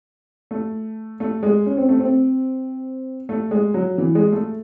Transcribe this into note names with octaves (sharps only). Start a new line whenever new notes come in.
A3
A3
G#3
C#4
C4
A3
C4
A3
G#3
F#3
E3
G#3
A3